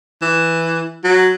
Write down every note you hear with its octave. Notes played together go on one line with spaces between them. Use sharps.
E3
F#3